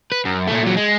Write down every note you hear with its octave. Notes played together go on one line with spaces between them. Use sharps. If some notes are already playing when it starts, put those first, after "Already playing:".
B4
F#2
A#2 A3
A#2 F#3
G#3